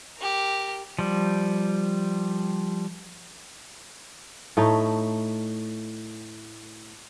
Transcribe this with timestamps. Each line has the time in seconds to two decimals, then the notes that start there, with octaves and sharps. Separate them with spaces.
0.17 G4 A#4
0.99 F3 G3
4.57 A2 A3 D#4